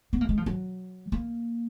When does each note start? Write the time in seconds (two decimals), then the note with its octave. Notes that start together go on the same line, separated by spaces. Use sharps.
0.13 B3
0.21 A#3
0.29 G#3
0.38 F3
0.46 F#3
1.12 A#3